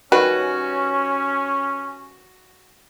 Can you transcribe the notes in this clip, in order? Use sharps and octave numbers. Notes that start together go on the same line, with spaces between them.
D#3 G3 C#4 F#4 B4